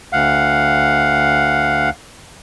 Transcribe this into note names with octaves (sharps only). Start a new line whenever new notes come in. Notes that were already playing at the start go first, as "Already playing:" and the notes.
D2 F5 F#5